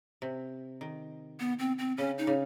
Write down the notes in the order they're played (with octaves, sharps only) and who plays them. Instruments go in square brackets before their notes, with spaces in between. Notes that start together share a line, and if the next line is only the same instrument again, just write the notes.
[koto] C3
D#3
[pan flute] B3
C4
C4
[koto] C#3 [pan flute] C#4
[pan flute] D#4
[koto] C#3